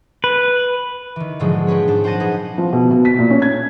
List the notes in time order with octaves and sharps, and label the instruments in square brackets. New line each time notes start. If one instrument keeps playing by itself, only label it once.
[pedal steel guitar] B4
[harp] D#3 E3
G#2 B2 D3 F3 F#3 G#3
C4 C#4 B4 C#5
G#2 D4
A#2 C5 F#5 A5 A#6 D#7
D#4 G#4 B4
[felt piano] F3
B2
B2
B6
A#2
C#4
G#6